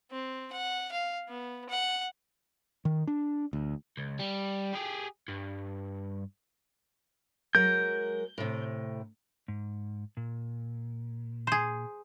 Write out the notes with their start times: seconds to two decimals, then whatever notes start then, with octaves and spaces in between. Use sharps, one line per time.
0.11 C4
0.52 F#5
0.92 F5
1.28 B3
1.69 F#5
2.85 D#3
3.07 D4
3.53 D2
3.97 C#2
4.19 G3
4.73 G4 G#4
5.28 G2
7.55 F#3 G#3 A#4 G6
8.38 A2 C3
9.48 G#2
10.17 A#2
11.47 G#4 C5